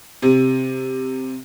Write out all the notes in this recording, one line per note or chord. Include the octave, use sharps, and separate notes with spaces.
C3